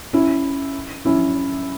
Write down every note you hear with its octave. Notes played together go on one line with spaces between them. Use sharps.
C#4 E4
C#4 E4